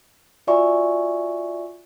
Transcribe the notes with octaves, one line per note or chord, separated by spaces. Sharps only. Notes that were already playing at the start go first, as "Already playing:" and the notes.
F4 F#4 D5 E5 G#5 C#6